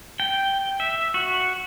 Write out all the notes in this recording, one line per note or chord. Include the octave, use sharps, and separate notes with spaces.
G5
E5
F#4